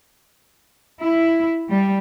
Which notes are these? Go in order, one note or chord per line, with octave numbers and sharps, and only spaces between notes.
E4
G3